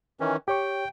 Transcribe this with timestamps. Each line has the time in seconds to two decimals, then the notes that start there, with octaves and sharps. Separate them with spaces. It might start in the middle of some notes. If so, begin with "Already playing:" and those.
0.20 D#3 E3 C#4
0.48 G4 C#5 G5 C#6